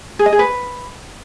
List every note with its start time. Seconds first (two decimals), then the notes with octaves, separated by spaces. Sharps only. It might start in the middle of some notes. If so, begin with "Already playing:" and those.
0.19 G#4
0.26 D#5
0.32 G#4
0.39 B4